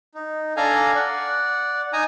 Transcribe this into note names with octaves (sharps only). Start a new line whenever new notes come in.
D#4
D4 A4 F5 G#5 A#5
D5 F#5
D#4 G#5 A#5 D#6